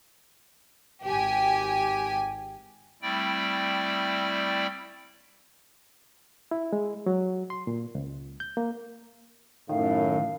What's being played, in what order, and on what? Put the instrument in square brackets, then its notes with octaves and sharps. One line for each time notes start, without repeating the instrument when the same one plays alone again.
[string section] G#1 G4 G#5
[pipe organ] G3 A3 C4 E4 D5 G5
[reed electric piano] E4
G#3
F#3
C6
A#2
C#2
G6
A#3
[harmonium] F#2 [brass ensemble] A2 [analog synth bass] D#3 [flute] F5